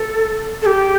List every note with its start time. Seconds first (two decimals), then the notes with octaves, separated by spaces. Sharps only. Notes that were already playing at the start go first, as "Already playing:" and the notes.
Already playing: A4
0.62 A4
0.66 G4